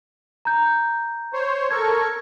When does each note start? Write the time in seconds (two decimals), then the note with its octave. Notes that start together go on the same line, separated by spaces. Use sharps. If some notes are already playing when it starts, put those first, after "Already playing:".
0.45 A#5 G6
1.33 C5 C#5
1.71 A4 A#4 C#6 G#6